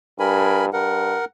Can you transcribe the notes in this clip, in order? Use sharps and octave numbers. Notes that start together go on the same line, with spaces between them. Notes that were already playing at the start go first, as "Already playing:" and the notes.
G2 A#4 G#5 B5
G2 A#4 F#5